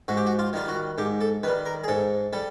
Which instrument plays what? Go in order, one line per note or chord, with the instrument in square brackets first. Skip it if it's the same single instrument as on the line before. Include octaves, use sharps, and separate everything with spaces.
[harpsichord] G#2 F#4
G4
F#4
F4
D#3 G3 F4
F#4
G#2 G4
A4
D#3 B4
G3
A#4
G#4
G#2 A4
G3 A4